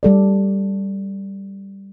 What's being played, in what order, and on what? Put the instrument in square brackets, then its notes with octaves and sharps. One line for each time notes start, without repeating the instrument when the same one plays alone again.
[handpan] G3 A4 D5